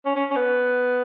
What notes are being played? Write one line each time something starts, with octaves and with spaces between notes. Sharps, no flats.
C#4
C#4
C#4
B3